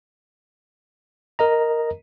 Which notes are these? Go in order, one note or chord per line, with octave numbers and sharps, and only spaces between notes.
A#4 D#5 A#5